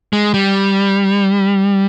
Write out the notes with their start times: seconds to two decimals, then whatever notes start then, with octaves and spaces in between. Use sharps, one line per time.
0.13 G#3
0.34 G3